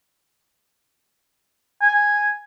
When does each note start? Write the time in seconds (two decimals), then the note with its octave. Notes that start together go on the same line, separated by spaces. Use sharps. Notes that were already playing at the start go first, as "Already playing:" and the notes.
1.82 G#5